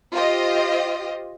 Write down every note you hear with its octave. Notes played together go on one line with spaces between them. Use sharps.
F4 G4 C5 D#5